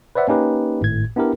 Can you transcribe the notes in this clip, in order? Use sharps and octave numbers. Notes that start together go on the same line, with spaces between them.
B4 C5 D5 E5 F#5
A#3 C#4 D#4 G4 B4
G#1 A2 G#6
B3 D4 E4 G4 A#4